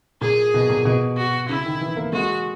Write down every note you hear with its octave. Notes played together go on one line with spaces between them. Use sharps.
A#2 G#4
B2
A#2
B2
F#4
C#3 E4
D#3
E3
A#3
G#3 F#4